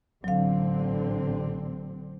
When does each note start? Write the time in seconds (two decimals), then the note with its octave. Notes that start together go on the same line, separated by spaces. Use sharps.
0.24 A1 D3 F#3 C4 F5